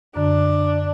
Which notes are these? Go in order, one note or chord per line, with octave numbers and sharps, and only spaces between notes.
F#2 D3 D4